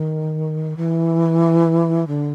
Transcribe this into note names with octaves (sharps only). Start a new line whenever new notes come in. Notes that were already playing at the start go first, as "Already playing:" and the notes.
Already playing: D#3
E3
D3